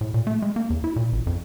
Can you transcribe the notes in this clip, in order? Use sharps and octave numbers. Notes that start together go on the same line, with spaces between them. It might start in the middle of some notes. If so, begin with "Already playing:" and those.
A2
A#2
A3
G#3
A#3
E2
E4
A#2
A1
F2